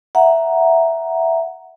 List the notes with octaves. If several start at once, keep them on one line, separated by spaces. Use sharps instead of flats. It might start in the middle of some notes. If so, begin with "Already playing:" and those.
E5 F#5 A#5